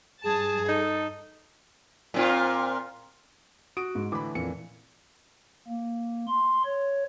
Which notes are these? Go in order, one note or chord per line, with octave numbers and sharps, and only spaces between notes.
G2 G#4 A5
D#4 A4
A#2 C4 F4
F#4 D#6 D7
G#2
A2 D3 E3 B5 D6
F2 A#2 E3 C#7
A#3
C6
C#5